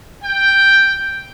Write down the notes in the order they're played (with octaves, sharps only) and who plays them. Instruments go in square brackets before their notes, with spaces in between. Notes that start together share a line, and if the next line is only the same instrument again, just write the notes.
[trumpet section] G5